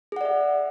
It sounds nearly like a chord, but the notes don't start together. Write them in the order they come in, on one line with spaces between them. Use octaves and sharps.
G#4 F#5 D5 E5